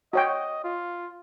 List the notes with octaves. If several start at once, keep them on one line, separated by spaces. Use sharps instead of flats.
F#4 C#5 D#5 G5
F4